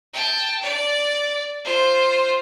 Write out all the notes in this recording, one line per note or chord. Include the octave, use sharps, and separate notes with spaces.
G5 A5
D5
F4 C5